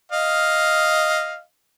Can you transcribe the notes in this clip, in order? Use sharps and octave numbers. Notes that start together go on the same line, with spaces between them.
D#5 F5